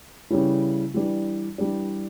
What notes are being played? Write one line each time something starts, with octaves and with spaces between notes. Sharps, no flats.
C#3 E3 G3 C#4 E4
E3 G3 D4
E3 G3 D4